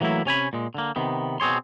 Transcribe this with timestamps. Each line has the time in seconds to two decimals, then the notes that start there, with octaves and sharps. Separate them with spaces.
0.01 E3 F#3 A3 A#3 E4
0.25 C3 C#4 G#5 B5
0.53 A#2 G#3
0.74 D3 A#3
0.96 C3 D#3 B3
1.40 B2 C4 G#4 C#5 C6